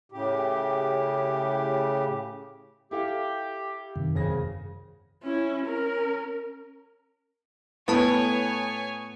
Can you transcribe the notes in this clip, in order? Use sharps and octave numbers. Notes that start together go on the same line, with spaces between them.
A2 C#3 G4
E4 G4 A4 F5
F#2 C3 D#3
G#1 C#3 G#4 A#6
C#4 E4
C#4 A#4
A2 B3 B4 C#5 G#5 A5 B5